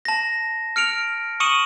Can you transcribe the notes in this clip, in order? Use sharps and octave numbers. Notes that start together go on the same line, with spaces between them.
A5 A#6
F6 C#7 D7 F7
C#6 D#6 C#7 D#7 E7 F#7